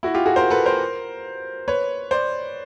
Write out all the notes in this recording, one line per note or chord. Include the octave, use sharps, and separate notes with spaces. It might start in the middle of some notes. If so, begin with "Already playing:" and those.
E4 F#4
F4 G4
F#4 G#4
A#4 C5
A4 B4
A#4 C5
B4 C#5
C5 D5